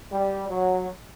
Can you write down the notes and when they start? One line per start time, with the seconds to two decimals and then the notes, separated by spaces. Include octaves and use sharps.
0.12 G3
0.49 F#3